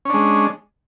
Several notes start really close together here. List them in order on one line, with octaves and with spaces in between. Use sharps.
C#4 D4 G#3